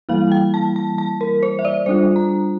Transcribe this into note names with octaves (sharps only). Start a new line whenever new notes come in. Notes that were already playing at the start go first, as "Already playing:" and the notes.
E3 G3 A#3 E4 F5
G5
A5
A5
A5
A#4
C5
E5
D5
G3 D4 F4 C5
A#5